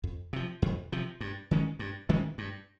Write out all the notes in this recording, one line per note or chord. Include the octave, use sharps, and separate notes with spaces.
F2
C3 F3
F2
C3 F3
G2
D#3 G#3 C#4
G2
D#3 G#3 C#4
G2